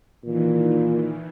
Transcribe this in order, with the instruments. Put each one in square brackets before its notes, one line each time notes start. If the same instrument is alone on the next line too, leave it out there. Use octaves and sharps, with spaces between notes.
[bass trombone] A#2 [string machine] D#3 E3